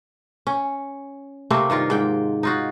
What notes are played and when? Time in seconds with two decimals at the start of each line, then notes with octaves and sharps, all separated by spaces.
0.47 C#4
1.50 C3 A3 A#3 C4
1.70 G2 D#3 F4 A#4
1.90 G#2 G5
2.43 D#4 F4 F#4